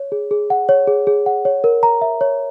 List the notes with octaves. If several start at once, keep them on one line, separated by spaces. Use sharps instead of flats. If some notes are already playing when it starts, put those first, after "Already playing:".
Already playing: C#5
G#4
G#4
F#5
C#5
G#4
G#4
F#5
C#5
A#4
A#5
E5
C#5